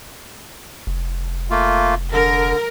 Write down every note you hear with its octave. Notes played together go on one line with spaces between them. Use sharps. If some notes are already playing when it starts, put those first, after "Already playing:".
F1
A3 A#3 F4
D3 A#4